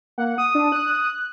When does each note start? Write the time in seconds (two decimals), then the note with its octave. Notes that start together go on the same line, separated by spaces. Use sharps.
0.18 A#3 F#5
0.38 D#6
0.55 D4
0.72 F#6